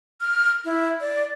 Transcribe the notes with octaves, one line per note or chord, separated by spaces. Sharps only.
F6
E4
D5